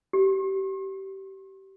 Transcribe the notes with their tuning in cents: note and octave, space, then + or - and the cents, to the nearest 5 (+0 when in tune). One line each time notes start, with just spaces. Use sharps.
G4 -25